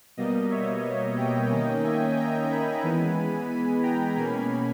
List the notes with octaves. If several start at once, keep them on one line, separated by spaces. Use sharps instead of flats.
B2 G3 A#3 D#5
C#5 E5
D#5 G5
D#3 A#3 C#4
E5 G#5
G5 A#5
G#5 B5
E3 G#3 B3
G#5 B5
G5 A#5
B2 A#3 C#4 G#5 B5